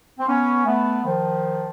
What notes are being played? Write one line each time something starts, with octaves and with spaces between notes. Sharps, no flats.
C4
B3 C#4
A3 B3
D#3 F3